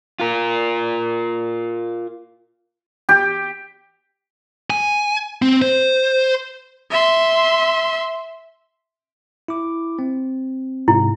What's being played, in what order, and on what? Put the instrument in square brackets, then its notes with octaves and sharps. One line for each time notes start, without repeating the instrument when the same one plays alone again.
[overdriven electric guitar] F4 A#4
[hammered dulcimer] G4
[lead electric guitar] G#5
C4
C5
[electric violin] E5 C6
[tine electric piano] E4 D6
C4
[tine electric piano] G#2 C3 [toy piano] E4